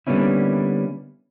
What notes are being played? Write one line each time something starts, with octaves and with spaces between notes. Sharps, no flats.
D3 G3 A#3 B3 C#4 E4